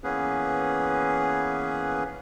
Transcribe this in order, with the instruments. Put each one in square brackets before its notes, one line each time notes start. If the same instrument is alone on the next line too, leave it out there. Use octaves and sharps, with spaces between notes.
[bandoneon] E3 A#3 B3 C#4 G#4 B4